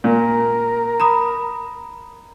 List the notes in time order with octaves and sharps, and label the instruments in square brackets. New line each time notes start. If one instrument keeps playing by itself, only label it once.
[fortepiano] A#2 [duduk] A#4
[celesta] A#5 B5 D#6